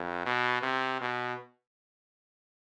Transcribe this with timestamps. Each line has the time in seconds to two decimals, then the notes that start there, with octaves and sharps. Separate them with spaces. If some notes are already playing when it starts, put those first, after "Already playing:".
Already playing: F2
0.26 B2
0.62 C3
1.01 B2